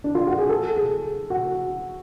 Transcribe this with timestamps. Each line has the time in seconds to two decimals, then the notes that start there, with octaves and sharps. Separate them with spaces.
0.04 D4
0.15 F4
0.27 F#4
0.38 G#4
0.49 A4
0.76 G#4
1.30 F#4